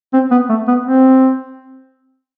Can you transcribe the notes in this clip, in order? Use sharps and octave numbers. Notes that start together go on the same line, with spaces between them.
C4
B3
A3
B3
C4